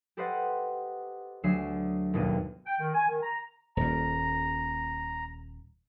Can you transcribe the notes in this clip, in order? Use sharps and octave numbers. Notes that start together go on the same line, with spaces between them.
G4 A4 B4 C5 D#5 F#5
D2 F#3 G#4 E5 C7 E7
G1 D#2 B2 D#3 D#7
G5
D#3
G#5
D#3
A#5
D#1 A#2 A#5